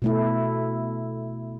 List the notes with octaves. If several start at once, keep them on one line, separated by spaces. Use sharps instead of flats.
B2 A3 E4